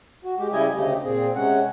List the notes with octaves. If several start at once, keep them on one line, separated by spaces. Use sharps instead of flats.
F#4
G#3 G4
C#3 G3 E4 G4 D#5 G#5
D2 C#3 A3 G4 D#5
A#2 C4 G#4
C3 G#3 C#4 F#5